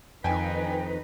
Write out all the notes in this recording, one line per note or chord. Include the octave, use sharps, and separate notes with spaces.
F2 D#3 D#4 B4 G5 G#5